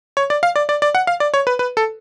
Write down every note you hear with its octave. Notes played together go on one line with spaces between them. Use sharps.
C#5
D5
F5
D5
D5
D5
F#5
F5
D5
C#5
B4
B4
A4